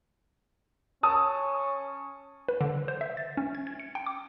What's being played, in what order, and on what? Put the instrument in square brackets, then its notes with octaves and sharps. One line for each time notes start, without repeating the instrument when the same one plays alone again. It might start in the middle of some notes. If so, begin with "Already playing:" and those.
[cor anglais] C#4 [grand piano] A5 D#6
[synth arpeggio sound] B4
D3
C5
E5
A6
C#4
G#6
G#6
C#7
G5
D6